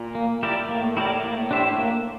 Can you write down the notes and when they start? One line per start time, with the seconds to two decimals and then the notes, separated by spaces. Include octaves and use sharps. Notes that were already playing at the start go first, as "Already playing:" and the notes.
Already playing: A#2
0.15 A#3
0.43 E4 G4 A#4 D5
0.69 A2 A#3
0.97 E4 G4 A#4 D5
1.24 A#3
1.51 D4 G4 C5 E5
1.78 A#3